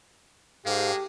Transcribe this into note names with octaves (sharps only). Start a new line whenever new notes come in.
G#2 G#3 G4 A4 F5